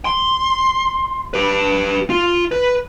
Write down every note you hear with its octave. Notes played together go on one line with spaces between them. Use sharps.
C6
G4 B4
F4
B4